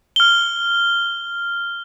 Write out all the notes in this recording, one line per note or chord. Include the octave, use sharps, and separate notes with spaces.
F6 G7